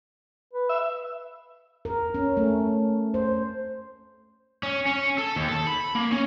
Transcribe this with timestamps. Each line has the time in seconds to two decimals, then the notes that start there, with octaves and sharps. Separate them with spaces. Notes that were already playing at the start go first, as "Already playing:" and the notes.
0.53 B4
0.69 E5
1.85 A#4
2.14 C#4
2.37 A3
3.14 C5
4.63 C#4
4.86 C#4
5.18 A4
5.36 D#2
5.48 A4
5.67 B5
5.95 A#3
6.12 C#4